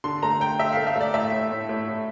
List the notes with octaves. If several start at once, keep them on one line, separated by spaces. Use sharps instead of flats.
D3 C6
A3 A#5
A3 G5
A3 E5
F5
A3
E5
A3 D5
A2 E5
A2
A2
A2
A2